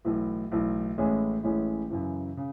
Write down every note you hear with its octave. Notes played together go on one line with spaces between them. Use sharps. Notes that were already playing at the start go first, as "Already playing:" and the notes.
B1 A2 E3
B1 A2 E3
A1 A2 G#3 C#4 E4
A1 A2 G#3 C#4 E4
F#2 C#3 E3
C#3